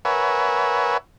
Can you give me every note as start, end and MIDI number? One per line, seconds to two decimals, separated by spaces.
0.05 0.97 70
0.05 0.97 71
0.05 0.97 73
0.05 0.97 76
0.05 0.97 78
0.05 0.97 80